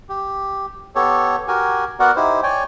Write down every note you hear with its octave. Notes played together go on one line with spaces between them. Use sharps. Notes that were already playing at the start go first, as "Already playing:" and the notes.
G4
B3 G4 A4 C#5
F#4 G4 A#4 G#5
B3 F#4 A#4 D5 F#5
D#4 E4 G4 C5
C#5 D5 G5 G#5